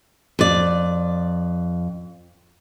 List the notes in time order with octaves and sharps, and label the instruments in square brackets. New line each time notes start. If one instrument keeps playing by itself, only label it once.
[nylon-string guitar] F2 D5